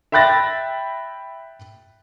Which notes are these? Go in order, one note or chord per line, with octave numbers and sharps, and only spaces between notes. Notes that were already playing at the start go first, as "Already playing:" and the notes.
E5 G5 B5 F#6 A6 A#6